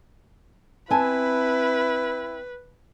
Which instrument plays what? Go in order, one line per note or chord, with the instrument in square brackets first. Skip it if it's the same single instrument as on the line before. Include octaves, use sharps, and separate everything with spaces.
[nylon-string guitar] C4 G#5 A5 [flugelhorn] E4 [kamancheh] B4